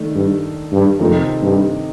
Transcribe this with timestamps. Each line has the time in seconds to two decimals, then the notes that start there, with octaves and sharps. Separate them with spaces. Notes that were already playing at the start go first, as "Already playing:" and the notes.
Already playing: D#3 A3 D4
0.15 G2
0.72 G2
1.00 F2 C3 D#3 A3 C4 D#4
1.42 G2